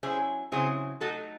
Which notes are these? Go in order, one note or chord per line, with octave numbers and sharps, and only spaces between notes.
F#3 C#4 E4 G#4 C5
C#3 F#3 C4 E4 G#4 C5
F#3 A3 D#4 F#4 A4